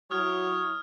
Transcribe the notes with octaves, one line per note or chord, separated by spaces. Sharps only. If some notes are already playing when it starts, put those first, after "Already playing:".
F#3 E4 C#5 D#6 F6 G#6